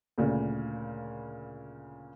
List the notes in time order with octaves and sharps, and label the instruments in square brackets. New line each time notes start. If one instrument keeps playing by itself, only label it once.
[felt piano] D2 A#2 C#3